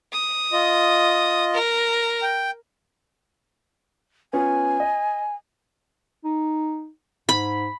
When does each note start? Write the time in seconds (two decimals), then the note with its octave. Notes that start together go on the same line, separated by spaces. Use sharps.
0.13 D#6
0.53 F4 D#5
1.53 A#4
2.22 G5
4.33 B3 C#4 F4 G#5
4.80 D#5
6.24 D#4
7.29 G#2 B5